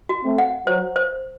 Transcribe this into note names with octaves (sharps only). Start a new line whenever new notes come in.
F#4
A3 C4
F#5
F#3 C5
C5